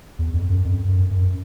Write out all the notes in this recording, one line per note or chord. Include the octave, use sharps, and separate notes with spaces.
E2
F2
F#2
F2
F#2
F#2